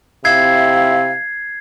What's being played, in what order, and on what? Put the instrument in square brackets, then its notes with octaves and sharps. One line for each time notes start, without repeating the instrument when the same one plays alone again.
[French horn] C3 [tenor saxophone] E4 [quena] F5 [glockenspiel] G#6 C7